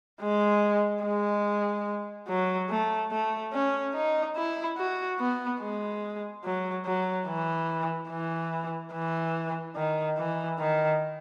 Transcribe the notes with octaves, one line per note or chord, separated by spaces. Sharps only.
G#3
G#3
F#3
A3
A3
C#4
D#4
E4
F#4
B3
G#3
F#3
F#3
E3
E3
E3
D#3
E3
D#3